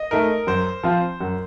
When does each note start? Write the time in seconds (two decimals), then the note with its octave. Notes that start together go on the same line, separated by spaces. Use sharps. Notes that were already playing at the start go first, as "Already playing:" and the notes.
Already playing: D#5
0.11 A3 D#4 A#4
0.47 F#2 C5
0.83 F3 C4 F4
1.20 F#2